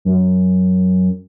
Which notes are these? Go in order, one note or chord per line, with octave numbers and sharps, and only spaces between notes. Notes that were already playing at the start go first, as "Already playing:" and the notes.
F#2